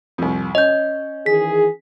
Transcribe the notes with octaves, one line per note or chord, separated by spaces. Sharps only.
C2 F2
C#4 D#5 G6
D#3 E3 G#4 B6